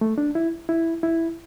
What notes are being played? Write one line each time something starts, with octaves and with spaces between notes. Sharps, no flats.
A3
D4
E4
E4
E4